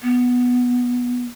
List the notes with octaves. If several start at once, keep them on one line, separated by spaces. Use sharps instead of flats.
B3